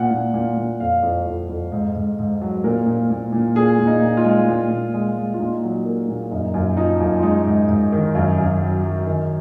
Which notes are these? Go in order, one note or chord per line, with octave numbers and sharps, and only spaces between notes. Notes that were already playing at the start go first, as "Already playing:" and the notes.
Already playing: A#2 F#5
A#2
A#2
A#2
F2 F5
F2
F2
F2
G#2
G#2
G#2
F#3
A#2 A#4
A#2
A#2
A#2
A#2 G#4
A#2
D#4
A#2
F4
G#3
A#2
A#2
G#3
G#3
F4
A#2 D#4
F#3
A#3
A#2
F#2 D#4
F#2
F3 D#4
F#2
F4
G#3 D#4
G#2
G#2
D#3
F#2
F#2
F#3
F#3
D#3